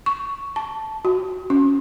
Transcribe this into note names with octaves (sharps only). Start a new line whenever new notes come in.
C#6
A5
F#4
C#4